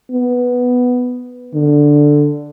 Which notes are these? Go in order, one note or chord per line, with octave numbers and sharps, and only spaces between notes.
B3
D3